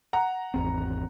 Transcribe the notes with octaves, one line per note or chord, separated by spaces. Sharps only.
F#5 A#5
G#1 E2 C4